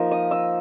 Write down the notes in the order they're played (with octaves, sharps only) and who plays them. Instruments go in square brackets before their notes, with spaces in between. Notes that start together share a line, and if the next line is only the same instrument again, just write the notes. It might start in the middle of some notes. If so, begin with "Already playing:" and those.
Already playing: [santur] F3 A#3 D#4
D#6
E6